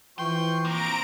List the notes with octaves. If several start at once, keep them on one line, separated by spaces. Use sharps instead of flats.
E3 F3 G5 C6 C#6
A#3 C4 A#5 D7